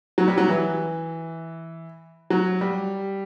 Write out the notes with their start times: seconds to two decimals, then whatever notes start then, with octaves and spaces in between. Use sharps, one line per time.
0.18 F#3
0.28 G3
0.38 F#3
0.48 E3
2.30 F#3
2.61 G3